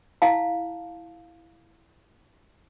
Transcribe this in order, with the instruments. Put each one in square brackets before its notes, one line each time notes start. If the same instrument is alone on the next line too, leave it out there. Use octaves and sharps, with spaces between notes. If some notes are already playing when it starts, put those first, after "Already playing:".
[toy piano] E4 F5 A5